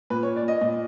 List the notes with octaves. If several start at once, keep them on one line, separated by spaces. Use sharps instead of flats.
A#2 B4
C#5
D5
D#5
A#2